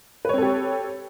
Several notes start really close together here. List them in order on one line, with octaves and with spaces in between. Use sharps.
B4 C#5 C4 A4 G4